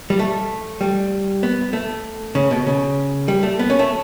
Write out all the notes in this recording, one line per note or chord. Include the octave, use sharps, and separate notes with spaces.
G3
A3
G3
B3
A3
C#3
B2
C#3
G3
A3
B3
C#4
A3